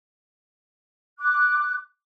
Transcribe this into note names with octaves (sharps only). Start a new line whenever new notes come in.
D6 F#6